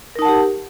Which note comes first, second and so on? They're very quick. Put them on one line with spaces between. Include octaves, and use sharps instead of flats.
A#4 D#4 A5 F#5 G4